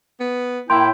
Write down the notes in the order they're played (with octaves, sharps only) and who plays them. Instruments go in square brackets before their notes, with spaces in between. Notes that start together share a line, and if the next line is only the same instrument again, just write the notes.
[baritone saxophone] B3
[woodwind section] A2 E4 G5 [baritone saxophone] A#3 [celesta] C6